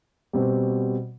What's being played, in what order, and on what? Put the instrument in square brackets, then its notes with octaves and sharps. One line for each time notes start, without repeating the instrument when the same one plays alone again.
[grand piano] B2 G3 C4 F#4